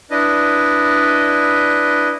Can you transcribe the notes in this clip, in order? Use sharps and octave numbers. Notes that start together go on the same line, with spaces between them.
D4 E4 B4 D#5